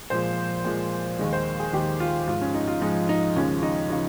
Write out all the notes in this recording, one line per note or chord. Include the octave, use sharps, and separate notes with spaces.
A#2 F3 G#3 C5
A#2 F3 G#3
D#2 D#3 G#3
C5
G#4
D#2 D#3 G#3 G4
F4
G#2 F3 G#3 F4
C#4
D#4
F4
G#2 F3 G#3 D#4
D#4
D#2 C#3 F3 G#3 C#4
D#4
C#3 F3 D#4